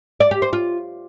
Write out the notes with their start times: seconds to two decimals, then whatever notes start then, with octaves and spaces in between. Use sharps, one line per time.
0.20 D5
0.31 G4
0.42 C5
0.53 F4